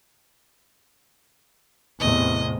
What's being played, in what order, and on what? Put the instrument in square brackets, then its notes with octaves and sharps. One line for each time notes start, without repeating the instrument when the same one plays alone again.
[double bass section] E2 A2 C3 [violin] D#5